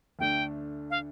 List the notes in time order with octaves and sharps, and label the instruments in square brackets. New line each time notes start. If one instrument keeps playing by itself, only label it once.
[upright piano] D2 D3 A3 D4 [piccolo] G5
[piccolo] F5